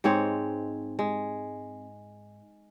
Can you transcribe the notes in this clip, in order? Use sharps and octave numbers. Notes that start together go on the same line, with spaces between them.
G#2 G#3 C4 C#5
G#3